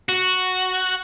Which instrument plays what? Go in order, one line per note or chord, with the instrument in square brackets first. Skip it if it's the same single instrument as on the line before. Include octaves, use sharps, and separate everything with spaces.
[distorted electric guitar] F#4